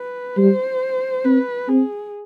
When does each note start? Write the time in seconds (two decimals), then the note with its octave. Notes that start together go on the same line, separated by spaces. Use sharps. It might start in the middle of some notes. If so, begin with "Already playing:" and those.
Already playing: B4
0.37 G3 C5
1.25 C4 B4
1.68 C4 G#4